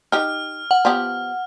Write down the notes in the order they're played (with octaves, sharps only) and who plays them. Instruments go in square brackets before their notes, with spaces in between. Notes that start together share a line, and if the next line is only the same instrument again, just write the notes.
[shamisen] D#4 G4 [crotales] F6
[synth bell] F#5
[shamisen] F3 B3 G4